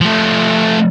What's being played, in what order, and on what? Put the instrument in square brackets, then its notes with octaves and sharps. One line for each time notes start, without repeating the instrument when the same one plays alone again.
[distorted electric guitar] F3 A3